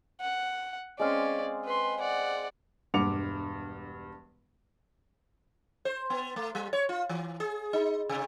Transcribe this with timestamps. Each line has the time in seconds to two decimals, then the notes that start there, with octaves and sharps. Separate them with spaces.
0.21 F#5
0.99 G#3 C4 C#4 D5 F5
1.65 B4 C6
2.01 D5 F#5
2.94 E1 G2 F#5 D6 C#7 F7
5.85 C5
6.10 B3
6.36 A3
6.55 G3
6.73 C#5
6.89 F4
7.09 E3
7.40 G#4
7.73 D#4
8.09 C3